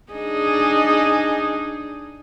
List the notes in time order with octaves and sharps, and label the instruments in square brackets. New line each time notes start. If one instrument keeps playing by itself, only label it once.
[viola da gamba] D4 D#4 G#4